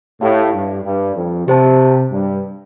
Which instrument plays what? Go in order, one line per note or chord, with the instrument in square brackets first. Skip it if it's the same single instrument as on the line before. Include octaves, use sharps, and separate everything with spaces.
[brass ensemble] A2 [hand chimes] G4 F5 A5
[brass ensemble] G2
G2
F2
[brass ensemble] C3 [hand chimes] G4 C5 A5
[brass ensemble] G2